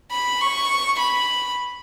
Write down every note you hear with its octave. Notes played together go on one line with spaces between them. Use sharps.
B5
C#6
B5